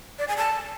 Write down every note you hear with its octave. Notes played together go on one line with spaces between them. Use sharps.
D5
G#5
A5